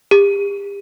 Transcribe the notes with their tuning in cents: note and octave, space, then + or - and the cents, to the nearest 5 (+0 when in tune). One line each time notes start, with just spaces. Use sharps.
G4 +40